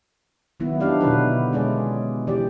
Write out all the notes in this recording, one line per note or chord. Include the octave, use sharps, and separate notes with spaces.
D#3 F#3 B3 E4
F#3 D4 D#4 G4 D5 F5
B2 D3 E4 F#4 B4
G#3 C#4 G#4 D5
E3 G4 D5